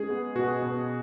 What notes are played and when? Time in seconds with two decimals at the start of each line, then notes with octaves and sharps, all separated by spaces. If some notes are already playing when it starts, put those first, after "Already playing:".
Already playing: G#3 C#4 G#4
0.10 B3
0.35 B2 F#4
0.62 B2